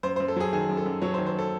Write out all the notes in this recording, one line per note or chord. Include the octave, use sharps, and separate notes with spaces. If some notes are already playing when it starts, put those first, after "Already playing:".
F#2 C5
C5
F#2
A4
F#3 G#4
D#3 G#4
F#2
A4
F#2
F#3 C#5
C5
D#3
C5
A4